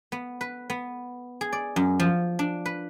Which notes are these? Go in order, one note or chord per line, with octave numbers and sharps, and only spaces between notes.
B3
B4
B3
G#4
D5
F#2
F3
D4
B4